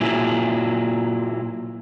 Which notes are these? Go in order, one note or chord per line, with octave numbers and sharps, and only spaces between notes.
A#2 F#3 E4 G#4